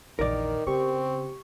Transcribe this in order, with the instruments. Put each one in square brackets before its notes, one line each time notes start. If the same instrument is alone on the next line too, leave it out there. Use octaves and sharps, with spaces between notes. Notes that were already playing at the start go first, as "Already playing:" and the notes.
[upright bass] A#1 E2 [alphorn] D#3 [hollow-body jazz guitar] A#4 D5
[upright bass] C#3 [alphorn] C4 [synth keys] G4 C#6